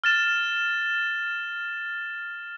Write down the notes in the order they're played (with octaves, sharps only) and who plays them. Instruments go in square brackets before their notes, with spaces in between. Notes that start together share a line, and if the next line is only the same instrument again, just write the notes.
[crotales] F6 A6 E7